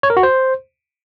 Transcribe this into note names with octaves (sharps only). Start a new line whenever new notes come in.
C#5
A#4
F#4
C5